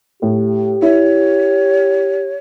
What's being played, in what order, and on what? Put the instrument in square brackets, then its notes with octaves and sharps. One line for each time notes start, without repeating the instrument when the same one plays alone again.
[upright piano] A2 [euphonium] G4
[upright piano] E4 [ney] C#5